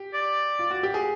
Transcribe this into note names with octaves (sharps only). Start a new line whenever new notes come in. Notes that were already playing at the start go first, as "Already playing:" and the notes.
Already playing: G4
D5
F4
F#4
G4
G#4